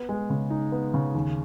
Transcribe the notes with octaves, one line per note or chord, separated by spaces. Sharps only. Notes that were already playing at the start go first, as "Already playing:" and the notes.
Already playing: B3
G#3
C#3
D#4
B3
C#3
D#2